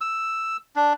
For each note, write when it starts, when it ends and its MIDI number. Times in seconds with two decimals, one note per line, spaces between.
0.01 0.57 88
0.76 0.93 62